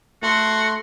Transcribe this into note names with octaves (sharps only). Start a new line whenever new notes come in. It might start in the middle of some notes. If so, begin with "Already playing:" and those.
A3 F#4 C6